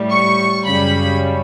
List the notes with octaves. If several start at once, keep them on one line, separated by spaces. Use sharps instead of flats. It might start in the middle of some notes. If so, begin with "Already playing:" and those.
Already playing: A2 G3
C#6
F#2 C#3 G3 B5